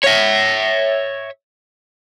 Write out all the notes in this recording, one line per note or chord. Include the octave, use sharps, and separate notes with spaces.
C#5 E5